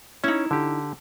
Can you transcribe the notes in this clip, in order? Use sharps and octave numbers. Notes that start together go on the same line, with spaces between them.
C#4 D#4 E4
D3 G4